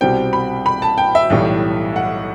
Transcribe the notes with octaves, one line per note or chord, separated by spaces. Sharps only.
C2 B2 G3 C4 G5
B5
B5
A5
G5
E5
B1 A2 E3 G3
F#5